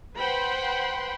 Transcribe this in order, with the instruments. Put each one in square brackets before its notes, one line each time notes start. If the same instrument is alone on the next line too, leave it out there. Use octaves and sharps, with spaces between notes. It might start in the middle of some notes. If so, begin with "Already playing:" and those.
[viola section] B4 C5 F#5 G5 B5 C6